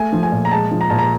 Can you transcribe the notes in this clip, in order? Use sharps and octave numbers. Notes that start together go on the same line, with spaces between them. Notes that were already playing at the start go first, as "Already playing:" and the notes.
Already playing: A3 G#5
F3
G#5
A#2
A#5
G#3 A5
F3
A#5
A#2 A5
A#5